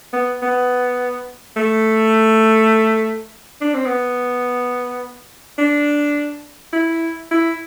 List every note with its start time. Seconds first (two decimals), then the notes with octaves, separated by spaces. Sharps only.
0.13 B3
0.43 B3
1.57 A3
3.62 D4
3.74 C4
3.86 B3
5.59 D4
6.73 E4
7.31 E4